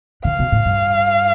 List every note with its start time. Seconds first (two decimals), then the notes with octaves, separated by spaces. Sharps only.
0.24 D3 F5
0.39 B2
0.52 A2
0.65 G2